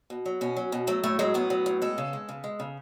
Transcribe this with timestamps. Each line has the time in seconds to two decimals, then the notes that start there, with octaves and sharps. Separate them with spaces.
0.10 B2
0.26 F#3
0.41 B2 C#4
0.57 F#3
0.72 B2
0.87 F#3 A3
1.04 A2 A3
1.19 F#3 G#3
1.34 A2 B3
1.50 F#3
1.66 A2
1.82 G#3 A4
1.98 C#3
2.13 G#3
2.29 C#3
2.44 G#3
2.60 C#3